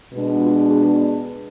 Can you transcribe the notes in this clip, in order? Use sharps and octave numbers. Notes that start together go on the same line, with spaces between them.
B2 G#3 B3 D4
F4
G#4